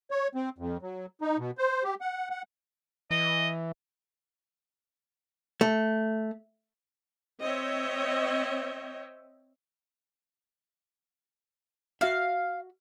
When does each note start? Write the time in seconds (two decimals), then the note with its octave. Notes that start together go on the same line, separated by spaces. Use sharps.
0.11 C#5
0.35 C4
0.59 F2
0.82 F#3
1.21 D#4
1.39 B2
1.58 C5
1.84 G4
2.01 F#5
2.30 F#5
3.11 E3 D#5
5.61 A3
7.41 C4 C#5 D#5 E5 G5
12.01 F#4 E5 F5